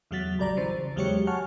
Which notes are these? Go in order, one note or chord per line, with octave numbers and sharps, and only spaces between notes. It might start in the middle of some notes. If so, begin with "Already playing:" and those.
E2 C#3 F#3 F#4 A6 B6
A#1 G3 D5 A#5 D6
C#3 E3 C5 A6
E2 F#3 G#3 G4 C#5 C#7
F#5 G#5 A5 C#6 F6